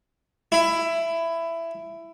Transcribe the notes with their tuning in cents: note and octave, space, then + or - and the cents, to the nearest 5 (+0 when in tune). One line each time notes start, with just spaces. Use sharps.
E4 +15